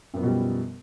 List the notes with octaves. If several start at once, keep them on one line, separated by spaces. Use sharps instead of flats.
F#2 B2 F3 G3 B3